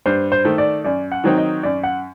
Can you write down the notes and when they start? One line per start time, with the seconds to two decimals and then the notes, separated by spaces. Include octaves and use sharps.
0.06 G2 C5
0.32 C5
0.45 D#3 A3
0.58 D5
0.84 F#2 D5
1.12 F#5
1.24 D#3 F#3 C4 D#4
1.38 D#5
1.63 F#2 D5
1.83 F#5